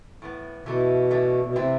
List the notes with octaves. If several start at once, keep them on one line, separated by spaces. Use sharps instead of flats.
A2 E3 B3
B2 E3 A3 E4
E3 A3 D4
B2
C3 E3 A3 C4 E4